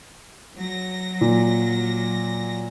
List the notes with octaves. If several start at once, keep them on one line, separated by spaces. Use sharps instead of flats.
F#3 A#6
A#2